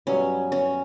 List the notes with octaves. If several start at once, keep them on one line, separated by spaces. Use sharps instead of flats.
G2 F#3 B3 C#4
C#4